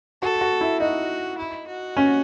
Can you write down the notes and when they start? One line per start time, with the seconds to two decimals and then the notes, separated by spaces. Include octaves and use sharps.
0.22 F#4 A4
0.41 F#4
0.61 E4
0.80 D#4 F#4
1.38 E4
1.67 F#4
1.97 C#4